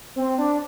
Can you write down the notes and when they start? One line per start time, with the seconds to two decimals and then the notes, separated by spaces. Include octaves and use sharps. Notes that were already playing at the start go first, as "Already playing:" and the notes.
0.16 C4
0.38 D4